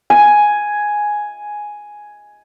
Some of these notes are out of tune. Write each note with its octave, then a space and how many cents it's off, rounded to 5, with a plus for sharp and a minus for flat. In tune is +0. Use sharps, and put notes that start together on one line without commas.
G#5 +5